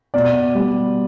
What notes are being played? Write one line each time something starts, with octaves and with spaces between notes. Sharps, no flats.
B2 D5
G3